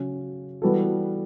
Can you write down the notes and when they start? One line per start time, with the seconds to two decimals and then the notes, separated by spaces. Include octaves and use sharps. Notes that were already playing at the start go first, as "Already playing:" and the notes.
Already playing: C#3 F#3 C#4
0.62 E3 G3 B3 F#4 A4